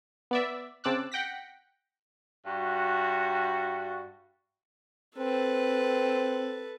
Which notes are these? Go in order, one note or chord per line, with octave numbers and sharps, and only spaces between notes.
B3 D5 E5
C#3 C4 A5 D6 E6 F#6
F#5 G5 A#6 B6
G2 F#4
C4 A4 B4